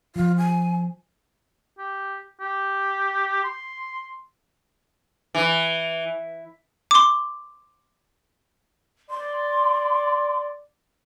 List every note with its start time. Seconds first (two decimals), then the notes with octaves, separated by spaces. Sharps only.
0.16 F3 F4
0.38 G#5
1.79 G4
2.41 G4
3.44 C6
5.35 E3
6.91 C6 D6
9.10 D5 C6